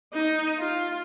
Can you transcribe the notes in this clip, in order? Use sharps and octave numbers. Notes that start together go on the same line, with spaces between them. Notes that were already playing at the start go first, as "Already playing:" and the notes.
D#4
F4